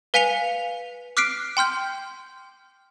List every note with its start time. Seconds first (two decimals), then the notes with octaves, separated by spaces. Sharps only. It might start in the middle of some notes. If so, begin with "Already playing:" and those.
0.14 B4 F5 G#5 B6 C#7 F7
1.17 D6 F6 F#6 B6 C7 D7
1.57 G5 C6 F6 G6